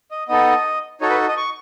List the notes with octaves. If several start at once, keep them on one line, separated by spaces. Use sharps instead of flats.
D#5
B3 D#4 A4 D#5
D#4 F#4 A4 C#5
B4
D#5
C#6